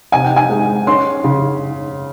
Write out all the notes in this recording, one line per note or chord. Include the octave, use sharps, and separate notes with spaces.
C3 G#5
G5
G#5
G#3
C#4 C6
C#3